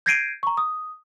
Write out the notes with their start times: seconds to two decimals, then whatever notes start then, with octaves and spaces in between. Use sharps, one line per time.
0.06 G6 G#6 A#6 C7 D7 D#7
0.43 A#5 C#6
0.57 D#6